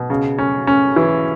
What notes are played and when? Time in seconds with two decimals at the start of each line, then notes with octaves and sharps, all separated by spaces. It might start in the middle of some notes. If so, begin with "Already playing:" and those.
Already playing: B2
0.10 C#3
0.39 C#4
0.67 C#4
0.96 E3